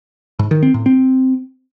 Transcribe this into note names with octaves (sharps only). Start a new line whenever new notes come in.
G#2
D#3
C4
A2
C4